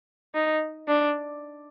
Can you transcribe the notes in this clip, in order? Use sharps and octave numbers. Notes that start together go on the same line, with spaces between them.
D#4
D4